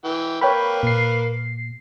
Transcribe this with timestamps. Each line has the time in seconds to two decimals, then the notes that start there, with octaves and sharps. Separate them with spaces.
0.04 E3 G5
0.41 A#3 B4 C#5 G5 B5
0.83 A#2 C7